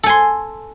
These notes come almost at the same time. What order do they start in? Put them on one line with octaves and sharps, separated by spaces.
A4 G#5 C6